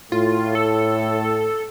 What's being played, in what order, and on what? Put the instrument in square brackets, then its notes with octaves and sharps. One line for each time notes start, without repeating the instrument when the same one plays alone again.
[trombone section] A2 [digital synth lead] F4
[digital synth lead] A4